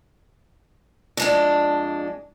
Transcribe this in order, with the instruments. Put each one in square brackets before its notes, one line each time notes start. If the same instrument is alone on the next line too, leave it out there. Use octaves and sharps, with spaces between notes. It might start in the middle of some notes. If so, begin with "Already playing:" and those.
[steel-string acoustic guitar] F2 G#3 D4